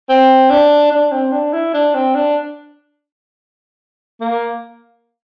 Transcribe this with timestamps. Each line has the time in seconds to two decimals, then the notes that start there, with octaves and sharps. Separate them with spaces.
0.09 C4
0.50 D4
0.92 D4
1.12 C4
1.32 D4
1.53 E4
1.74 D4
1.94 C4
2.15 D4
4.21 A#3